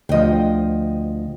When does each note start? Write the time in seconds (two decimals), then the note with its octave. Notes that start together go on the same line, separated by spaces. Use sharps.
0.09 D2 F3 D#5 G5